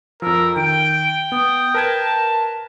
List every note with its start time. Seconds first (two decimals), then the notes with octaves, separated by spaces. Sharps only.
0.22 F2 F3 A#4 E6
0.56 D#3 G5 D7
1.32 B3 D#6
1.74 A#4 B4 A5 G#6